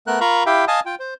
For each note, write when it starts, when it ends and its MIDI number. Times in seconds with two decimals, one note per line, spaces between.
0.07 0.20 57
0.07 0.20 59
0.07 0.20 70
0.07 0.20 90
0.21 0.44 65
0.21 0.44 70
0.21 0.44 77
0.21 0.44 82
0.21 0.44 83
0.21 0.44 85
0.46 0.65 64
0.46 0.65 67
0.46 0.65 76
0.46 0.65 77
0.46 0.65 79
0.68 0.80 75
0.68 0.80 77
0.68 0.80 80
0.68 0.80 81
0.68 0.80 87
0.86 0.95 65
0.86 0.95 79
1.00 1.14 72